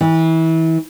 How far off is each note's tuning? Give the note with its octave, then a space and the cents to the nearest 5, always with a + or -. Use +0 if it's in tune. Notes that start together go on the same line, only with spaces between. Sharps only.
E3 -25